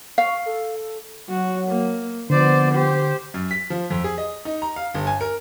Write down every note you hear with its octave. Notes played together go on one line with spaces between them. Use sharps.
F5 C#6
A4
F#3 F#4
A#3
D3 F3 B3 C5 D5
G4 C5
F#2
B6
F3
F2
G#4
D#5
D#4
A#5
F5
G1
G#5
A#4